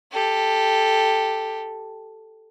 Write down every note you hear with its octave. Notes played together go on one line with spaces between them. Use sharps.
G4 A4